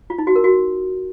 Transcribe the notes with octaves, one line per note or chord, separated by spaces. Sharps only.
F4
D#4
F#4
A#4
F#4